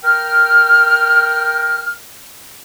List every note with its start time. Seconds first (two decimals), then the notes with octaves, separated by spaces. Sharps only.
0.04 A#4 G5 F6